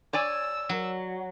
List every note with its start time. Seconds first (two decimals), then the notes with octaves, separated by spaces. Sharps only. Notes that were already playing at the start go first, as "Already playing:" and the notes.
0.13 C#5 D5 G#5 E6
0.69 F#3